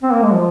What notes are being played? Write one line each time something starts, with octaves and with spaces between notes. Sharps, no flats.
C4
A#3
G#3
F3